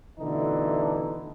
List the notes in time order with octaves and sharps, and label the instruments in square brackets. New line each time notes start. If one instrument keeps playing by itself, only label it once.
[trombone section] B2 D3 E3 A3 D4 D#4